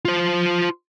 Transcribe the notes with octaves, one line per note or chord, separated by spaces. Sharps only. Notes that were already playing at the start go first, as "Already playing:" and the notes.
F4 C5